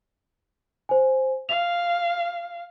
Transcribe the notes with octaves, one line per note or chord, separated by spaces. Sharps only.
C5 G#5
F5 F7